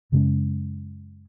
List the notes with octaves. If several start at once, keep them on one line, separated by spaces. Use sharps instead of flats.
F#2 C#3 G#3 C#4